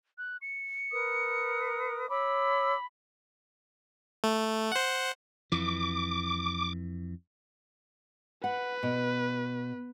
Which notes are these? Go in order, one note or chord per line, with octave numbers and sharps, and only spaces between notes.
F#6
C#7
A#4 B4 D#6
C#5 B5 D6 E6
A3
C5 F#5
F2 E3 D6
B4 F#5
B2